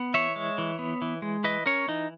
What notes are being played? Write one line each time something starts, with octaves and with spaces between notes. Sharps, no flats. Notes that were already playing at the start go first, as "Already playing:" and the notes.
Already playing: B3
E3 C#5 E5
G#3
E3
B3
E3
G#3
E3 B4 D#5
C#4 A#4 C#5
E3 D#4